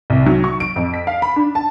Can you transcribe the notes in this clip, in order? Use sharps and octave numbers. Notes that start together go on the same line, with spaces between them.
C2
F#3
C#6
D7
F2
B6
F5
B5
D4
A5